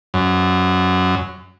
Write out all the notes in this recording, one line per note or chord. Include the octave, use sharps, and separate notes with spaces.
F#2